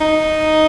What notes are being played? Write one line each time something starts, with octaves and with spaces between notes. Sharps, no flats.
D#4